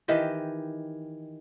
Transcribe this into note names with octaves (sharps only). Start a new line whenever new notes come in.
D#3 E3 G4 D#5